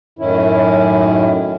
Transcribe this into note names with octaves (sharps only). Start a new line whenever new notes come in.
F#2 A2 D#3 C#4 E4